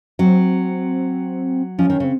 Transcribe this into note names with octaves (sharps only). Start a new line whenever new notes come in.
F#3 C4
F3 C#4
D#3
C#3 C4